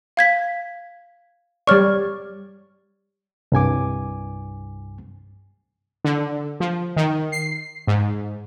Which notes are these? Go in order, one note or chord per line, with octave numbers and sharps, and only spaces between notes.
F5 G#6 B6
G3 C#5 D5 C#6 F6
C2 G2 G#5 D6
D3
F3
D#3
C7
G#2